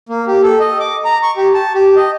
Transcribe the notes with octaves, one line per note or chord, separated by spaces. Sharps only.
A#3
G4
A4
D#5
D6
A#5
C#6
G4
A5
G4
D#5